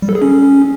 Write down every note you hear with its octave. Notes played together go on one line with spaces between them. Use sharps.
G3
A4
G#4
C#4